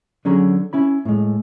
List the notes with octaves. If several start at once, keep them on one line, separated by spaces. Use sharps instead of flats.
D3 F#3 C#4 G#4 A#5
C#4 E4 B5
A2 G#3